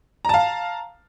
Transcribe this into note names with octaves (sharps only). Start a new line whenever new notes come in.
F5 A5 A#5